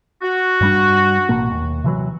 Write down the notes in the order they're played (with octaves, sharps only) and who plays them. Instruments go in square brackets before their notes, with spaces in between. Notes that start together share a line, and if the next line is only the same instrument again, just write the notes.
[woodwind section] F#4
[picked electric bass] G2 G3 D4
A1 B2 A#3
D#2
C3 E3 F#3